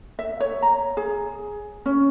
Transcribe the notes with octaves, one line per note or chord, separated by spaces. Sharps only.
E5
C#5
A#5
G#4
C#4